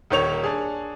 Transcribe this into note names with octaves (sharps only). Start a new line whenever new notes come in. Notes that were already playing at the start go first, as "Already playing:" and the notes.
D#1 D#3 C#5 F7
D4 G#4